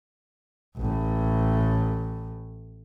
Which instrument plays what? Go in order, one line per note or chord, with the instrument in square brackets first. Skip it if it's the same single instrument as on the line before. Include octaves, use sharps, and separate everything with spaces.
[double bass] A1 A2